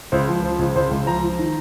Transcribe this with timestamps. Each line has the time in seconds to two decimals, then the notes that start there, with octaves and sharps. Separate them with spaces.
0.12 C#2 C5
0.28 F3
0.43 F3
0.59 C#2
0.75 C#2 C5
0.91 C#2
1.07 F3 A#5
1.23 F3
1.39 D#3